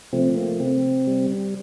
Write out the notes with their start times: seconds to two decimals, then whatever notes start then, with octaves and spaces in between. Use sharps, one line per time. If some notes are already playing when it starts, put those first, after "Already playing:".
0.13 C3 F3 A3 C4
0.36 A#3
0.60 C3 C4
1.07 G3